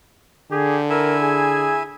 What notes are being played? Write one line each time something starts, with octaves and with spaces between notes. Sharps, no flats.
D3 G4 G#4
E4 A#4 E5 G#5
G#4